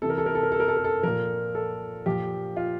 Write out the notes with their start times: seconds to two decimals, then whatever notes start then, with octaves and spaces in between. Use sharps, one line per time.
0.02 C3 E3 A4
0.10 A#4
0.18 A4
0.26 A#4
0.35 A4
0.43 A#4
0.52 A4
0.60 A#4
0.68 A4
0.77 A#4
0.84 A4
1.03 A#2 F3 A#4
1.55 A4
2.06 A#2 F3 G4
2.57 F4